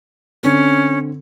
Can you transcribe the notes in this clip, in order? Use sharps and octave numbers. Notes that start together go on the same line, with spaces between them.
D3 C4 C#4